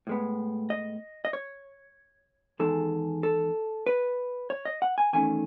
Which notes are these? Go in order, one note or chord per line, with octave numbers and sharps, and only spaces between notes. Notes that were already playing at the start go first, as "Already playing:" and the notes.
A2 G#3 B3
D#5
D#5
C#5
E2 D#3 G#3 A4
A4
B4
C#5
D#5
F#5
G#5
E2 D#3 A3 C#4 G#5